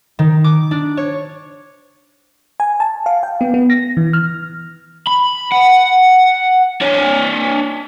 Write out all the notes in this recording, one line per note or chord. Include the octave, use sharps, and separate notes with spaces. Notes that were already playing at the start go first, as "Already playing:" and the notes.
D#3
D6
D4
C#5
G#5
A5
F5
G5
B3
B3
A#6
E3
F6
B5
F#5
D4 C#5